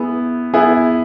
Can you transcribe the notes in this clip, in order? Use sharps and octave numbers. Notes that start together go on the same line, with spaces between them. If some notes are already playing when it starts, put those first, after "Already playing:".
Already playing: B3 E4 G#4
B3 E4 G#4